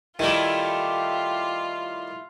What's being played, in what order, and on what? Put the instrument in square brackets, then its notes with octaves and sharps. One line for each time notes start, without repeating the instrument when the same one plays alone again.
[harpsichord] D#3 G3 [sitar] A3 E4 [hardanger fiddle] F4 [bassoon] G4